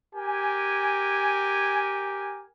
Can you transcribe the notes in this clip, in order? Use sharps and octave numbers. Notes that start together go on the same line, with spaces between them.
G4 A#4 G#5